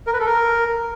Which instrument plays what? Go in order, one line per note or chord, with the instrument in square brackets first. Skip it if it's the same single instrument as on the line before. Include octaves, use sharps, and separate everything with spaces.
[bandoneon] A#4
B4
A4
A#4